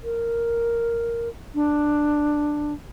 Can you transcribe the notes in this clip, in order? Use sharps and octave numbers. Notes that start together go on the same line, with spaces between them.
A#4
D4